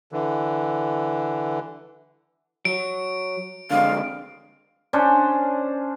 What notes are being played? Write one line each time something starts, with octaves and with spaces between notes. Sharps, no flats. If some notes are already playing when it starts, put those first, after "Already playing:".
D3 E3
F#3 D7
D3 G#3 C4 F5
C#4 D4 C5